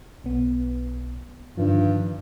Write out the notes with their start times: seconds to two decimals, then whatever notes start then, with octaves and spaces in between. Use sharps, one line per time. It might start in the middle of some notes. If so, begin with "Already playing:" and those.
0.24 B1 B3
1.57 G2 D3 D#3 F3